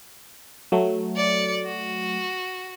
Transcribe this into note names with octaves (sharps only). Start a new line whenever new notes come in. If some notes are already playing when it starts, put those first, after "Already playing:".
F#3 A3
D5 C#7
F#4